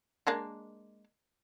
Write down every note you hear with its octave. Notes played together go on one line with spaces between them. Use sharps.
G#3 A#3 D4